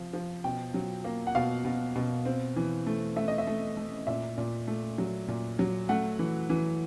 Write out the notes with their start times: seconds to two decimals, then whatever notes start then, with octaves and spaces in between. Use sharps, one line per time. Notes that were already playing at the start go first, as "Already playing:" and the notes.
Already playing: C3 F3
0.13 F3
0.44 B2 G5
0.74 F#3
1.04 A#3
1.27 F#5
1.35 B2 F5
1.65 B2
1.96 B2
2.25 C4
2.56 E3
2.87 A3
3.16 A3 E5
3.28 D#5
3.38 E5
3.47 A3
3.77 A3
4.07 A#2 E5
4.38 A#2
4.67 A3
4.98 F#3
5.28 A#2
5.59 F#3
5.89 A3 F#5
6.19 E3
6.50 E3